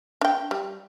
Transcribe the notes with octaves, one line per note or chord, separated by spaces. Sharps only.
D4 G5
G3